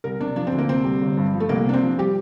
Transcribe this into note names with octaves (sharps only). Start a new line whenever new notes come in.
C2 A#4
C3 D4
F3 D4
C4
D2
A#3
C3 C4
G3
G1
G2
F3
A3
C2 A#3
C3 D4
C4
F3
G3 G4